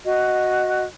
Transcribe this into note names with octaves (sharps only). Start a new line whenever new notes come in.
F#4 D#5